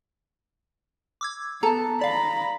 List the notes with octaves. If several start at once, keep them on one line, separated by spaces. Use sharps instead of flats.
D6 E6 G#6
B3 A4 A5 A#5
D5 F5 A#5 B5